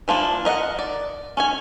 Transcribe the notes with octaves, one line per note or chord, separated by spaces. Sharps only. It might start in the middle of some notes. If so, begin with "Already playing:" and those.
E3 F3 A#3 D4
A#4 D#5 F5 F#5
D5
C#4 C#5 G#5